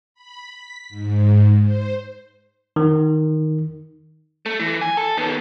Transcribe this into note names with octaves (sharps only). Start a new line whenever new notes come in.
B5
B6
G#2
C5
D#3
A3
E3
G#5
A4
D#3 B3